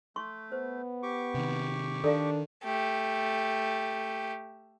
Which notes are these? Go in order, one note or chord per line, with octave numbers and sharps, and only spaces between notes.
A3 C6 C#6
B3 C5
G4 C#6 D6
C3 D#3
D#3 D4 A4 D5 F5
A3 G4